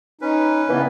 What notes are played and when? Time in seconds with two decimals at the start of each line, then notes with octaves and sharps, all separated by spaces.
0.21 C#4 D#4 B4
0.69 G2 C#3 E3 B3